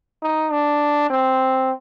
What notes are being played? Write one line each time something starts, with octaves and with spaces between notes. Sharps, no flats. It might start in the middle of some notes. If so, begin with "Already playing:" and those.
D#4
D4
C4